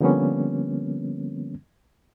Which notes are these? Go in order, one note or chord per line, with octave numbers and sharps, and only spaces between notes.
D3 F3 G3 A#3 B3 C#4